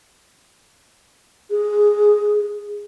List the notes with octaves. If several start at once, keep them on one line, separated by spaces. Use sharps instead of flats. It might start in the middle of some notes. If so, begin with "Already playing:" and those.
G#4